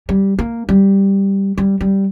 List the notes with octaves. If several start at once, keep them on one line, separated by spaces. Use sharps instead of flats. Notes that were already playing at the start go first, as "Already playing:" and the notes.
G3
A#3
G3
G3
G3